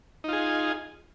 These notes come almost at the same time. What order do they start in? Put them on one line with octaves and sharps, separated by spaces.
D#4 F4 G#4